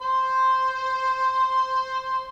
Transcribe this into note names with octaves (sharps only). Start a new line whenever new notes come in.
C5 C6